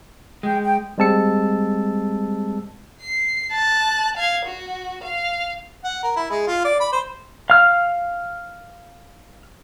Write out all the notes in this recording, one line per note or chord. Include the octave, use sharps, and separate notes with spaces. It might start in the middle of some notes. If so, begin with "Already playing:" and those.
G#3 G5
G5
G3 G#3 C4 A5 E6 C#7
C7
A5 F#6
F5 G#6
F#4
F5
F#5
A#4
E4
G#3
F4
D5
B5
C5
F5 F6